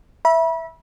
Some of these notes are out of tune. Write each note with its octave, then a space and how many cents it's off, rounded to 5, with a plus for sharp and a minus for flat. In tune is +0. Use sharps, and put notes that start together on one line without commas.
E5 +0 B5 -35